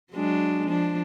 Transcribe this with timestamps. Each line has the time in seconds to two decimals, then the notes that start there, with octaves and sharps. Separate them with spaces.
0.13 F#3 G#3 D4
0.68 F3 D4